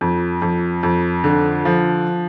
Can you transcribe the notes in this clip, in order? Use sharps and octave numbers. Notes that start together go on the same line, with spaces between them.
F2
F2
F2
D3
F3